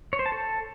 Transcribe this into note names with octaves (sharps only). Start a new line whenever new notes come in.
C#5
C5
A5
A4